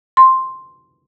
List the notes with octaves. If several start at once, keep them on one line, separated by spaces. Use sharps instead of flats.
C6